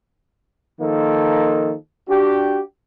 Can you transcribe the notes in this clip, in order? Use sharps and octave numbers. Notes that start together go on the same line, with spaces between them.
D#3 F3 A#3 D#4 A4
D4 F#4 G4